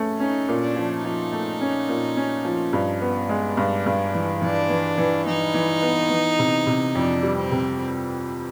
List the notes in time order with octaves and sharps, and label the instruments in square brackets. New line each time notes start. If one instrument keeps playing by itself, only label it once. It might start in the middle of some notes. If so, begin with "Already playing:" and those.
Already playing: [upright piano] A3 C#4
[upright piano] C#4 [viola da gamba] D#4
[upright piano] A#2
[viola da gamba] D4
[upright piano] F3
[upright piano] F3 [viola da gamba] D#4
[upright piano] A3
C#4
A#2
C#4
F3
G2
B3
[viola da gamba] D4
[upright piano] G#3
G2
G2
E3
[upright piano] E3 [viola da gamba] D4
[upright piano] E3
E3
[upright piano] E3 [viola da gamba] D#4
[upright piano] E3
B3
E3
C3
C3
[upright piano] F2 [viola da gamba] D4
[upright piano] G3
[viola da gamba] C4
[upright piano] C3